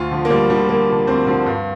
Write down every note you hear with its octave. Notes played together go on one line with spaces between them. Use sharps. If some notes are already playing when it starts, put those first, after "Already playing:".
Already playing: D2 F4
D3 F3
A#3
D2 G3
D3 F3 G3
D2 A#3
D3 F3
D2 C4
D3 F3
G2